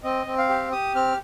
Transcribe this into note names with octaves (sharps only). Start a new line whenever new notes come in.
C4 D#5
C4
F5
G4
G4 D#6
C4 F6